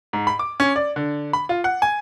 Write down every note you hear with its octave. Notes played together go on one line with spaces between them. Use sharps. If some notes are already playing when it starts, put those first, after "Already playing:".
G#2
B5
D6
C#4
D5
D3
B5
F4
F#5
G#5